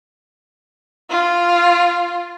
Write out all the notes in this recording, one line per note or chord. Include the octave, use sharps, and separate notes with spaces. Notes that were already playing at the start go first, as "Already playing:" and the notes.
F4